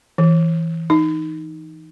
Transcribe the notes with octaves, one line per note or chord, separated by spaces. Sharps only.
E3
D#4